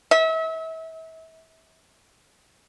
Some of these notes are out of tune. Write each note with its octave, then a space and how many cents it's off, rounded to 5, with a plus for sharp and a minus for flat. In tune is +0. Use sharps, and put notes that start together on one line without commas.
E5 -35